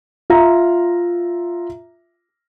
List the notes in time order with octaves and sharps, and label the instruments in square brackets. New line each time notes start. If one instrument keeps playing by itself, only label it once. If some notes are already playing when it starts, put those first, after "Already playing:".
[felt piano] F4 E5 A#5